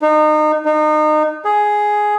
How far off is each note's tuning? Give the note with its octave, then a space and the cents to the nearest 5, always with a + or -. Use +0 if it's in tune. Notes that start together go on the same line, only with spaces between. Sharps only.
D#4 -30
D#4 -30
G#4 +5